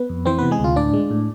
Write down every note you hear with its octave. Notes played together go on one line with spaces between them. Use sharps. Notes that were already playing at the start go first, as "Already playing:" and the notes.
Already playing: B3 B4
F2
E3 C4 C5
C3 B3 B4
G#3 G#4
D2 F4
A2 D4 D5
G#3
A2